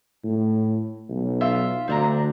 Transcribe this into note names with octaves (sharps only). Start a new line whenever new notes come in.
A2
B1
F4 E5
D2 C4 D4 A#5